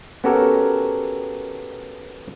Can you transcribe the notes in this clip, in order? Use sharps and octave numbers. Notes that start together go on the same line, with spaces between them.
B3 C#4 F#4 G4 A4 A#4